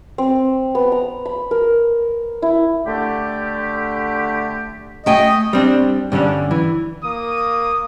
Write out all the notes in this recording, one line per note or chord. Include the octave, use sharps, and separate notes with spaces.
C4
B3
A#5
B5
A#4
E4
D3 A3 G4
A3 D#5 G5 G#5
G3 C4 D4
G2 D3 G3 C#4 D4
E3
A#3 D#6